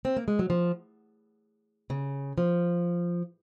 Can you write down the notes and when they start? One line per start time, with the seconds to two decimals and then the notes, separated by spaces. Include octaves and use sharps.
0.05 C4
0.17 A#3
0.28 G#3
0.39 F#3
0.50 F3
1.90 C#3
2.38 F3